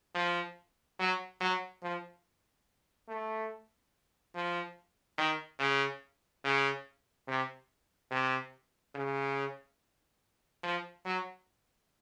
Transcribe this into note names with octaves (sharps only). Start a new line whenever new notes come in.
F3
F#3
F#3
F3
A3
F3
D#3
C#3
C#3
C3
C3
C#3
F3
F#3